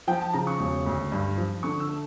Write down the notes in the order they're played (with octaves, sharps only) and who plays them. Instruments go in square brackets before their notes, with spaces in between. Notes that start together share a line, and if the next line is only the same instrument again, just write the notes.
[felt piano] F3 G5
A5
C#3 A#5
C#6
E1
D2
G2
F3
D3 C#6
E6
A3